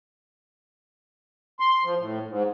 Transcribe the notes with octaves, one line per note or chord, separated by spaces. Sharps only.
C6
F3
A2
G#2